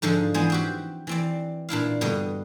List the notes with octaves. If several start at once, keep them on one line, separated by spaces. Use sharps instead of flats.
G#2 D3 F3 A4 D#5
E3 G#3 B3 G#4 C5
C4 F#4 G4
E3 C4 D5
A#2 D4 E4 F5
G2 B2 D3 D#5